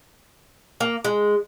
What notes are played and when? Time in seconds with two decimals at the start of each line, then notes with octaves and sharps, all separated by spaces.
0.80 A#3
1.04 G#3